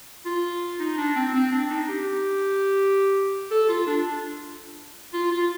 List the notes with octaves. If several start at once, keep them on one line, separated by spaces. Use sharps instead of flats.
F4
D#4
D4
C4
C4
D4
D#4
G4
A4
F4
D4
F4
F4